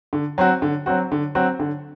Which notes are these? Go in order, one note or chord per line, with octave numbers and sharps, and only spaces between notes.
D3
F#3 C4 F#4
D3
F#3 C4 F#4
D3
F#3 C4 F#4
D3